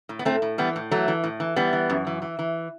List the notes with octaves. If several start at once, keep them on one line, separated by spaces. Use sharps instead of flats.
A2
B3
A2 A3 C4
A2
E3 G3 B3
A2
E3 F#3 A3
E3
A2
E3
E3 G3 B3
E3
F#2
E3
E3
E3